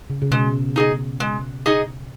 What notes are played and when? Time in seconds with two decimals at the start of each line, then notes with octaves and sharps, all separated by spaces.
0.10 C#3
0.22 C#3
0.31 B2 G#3
0.76 D#4 G#4 D#5
1.20 G#3
1.66 D#4 G#4 D#5